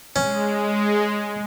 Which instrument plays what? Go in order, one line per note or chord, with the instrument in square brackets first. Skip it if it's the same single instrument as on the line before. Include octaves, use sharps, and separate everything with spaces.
[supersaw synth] G#3 [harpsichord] C#4